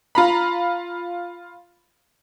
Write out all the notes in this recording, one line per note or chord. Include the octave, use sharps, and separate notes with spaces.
F4 A#5 B5